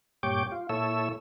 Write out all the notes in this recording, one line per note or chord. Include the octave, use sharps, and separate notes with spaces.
G2 A#2 G4 C#5 G5 D6
F4
A#2 E4 A4 C#5 E6